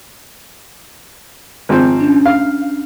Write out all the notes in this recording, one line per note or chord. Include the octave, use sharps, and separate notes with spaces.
G#1 F3 C4
C#4 D4
F5